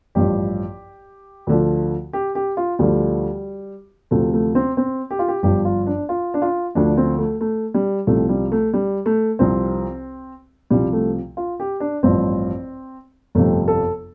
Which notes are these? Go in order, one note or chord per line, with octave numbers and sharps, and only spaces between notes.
A1 G2 F3 G4
D2 D3 F3
G4
G4
F4
D2 D3 F3 G3
D2 C3 F3 A3
A3
C4
C4
G4
F4
G4
G1 G2 F3 G4
F4
D4
F4
D4
F4
D2 D3 F3 D4
C4
A3
A3
G3
C2 C3 F3 A3
G3
A3
G3
A3
C2 C3 F3 C4
C2 C3 F3 G3
A3
F4
G4
D4
A1 G2 F3 C4
G1 F2 C3 F3 A3
A4